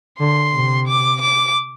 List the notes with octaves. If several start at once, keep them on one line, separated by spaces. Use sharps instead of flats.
D3 C6
C3
D6
D6